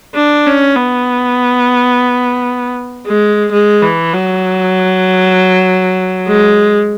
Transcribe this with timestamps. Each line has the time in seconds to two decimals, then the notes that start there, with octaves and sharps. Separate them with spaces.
0.15 D4
0.47 C#4
0.76 B3
3.07 G#3
3.52 G#3
3.83 E3
4.14 F#3
6.28 G#3